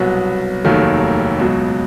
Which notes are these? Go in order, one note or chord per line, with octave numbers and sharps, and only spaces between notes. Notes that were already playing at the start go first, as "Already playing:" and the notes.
Already playing: C2 B2 F#3 B3
F1 D#2 D#3 F#3 A3
C#2 B2 F#3